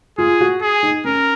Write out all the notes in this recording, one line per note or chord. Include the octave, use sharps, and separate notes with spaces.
F4 G#4
F#4
G#4
D#4
C#4 A#4